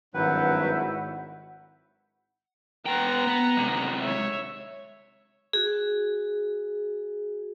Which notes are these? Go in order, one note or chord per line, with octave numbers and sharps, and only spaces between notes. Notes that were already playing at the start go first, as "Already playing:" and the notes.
G#1 G2 F#3 E4 F#4 B4 F#5 G6
B3 F#5 G5 A#5
B3
C3 G#3
C#5 E5
F#4 G#4